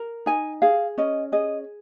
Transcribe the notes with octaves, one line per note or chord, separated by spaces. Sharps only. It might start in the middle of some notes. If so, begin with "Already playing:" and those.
Already playing: A#4
D#4 G#5
G#4 F5
C#4 D#5
G#4 D#5